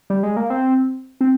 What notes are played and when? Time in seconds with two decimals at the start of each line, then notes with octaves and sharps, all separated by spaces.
0.10 G3
0.23 G#3
0.37 A#3
0.50 C4
1.21 C4